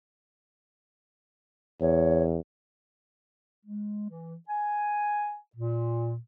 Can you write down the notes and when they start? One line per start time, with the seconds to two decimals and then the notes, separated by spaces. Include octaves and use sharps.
1.81 E2 C#5
3.65 G#3
4.09 E3
4.48 G#5
5.56 A#2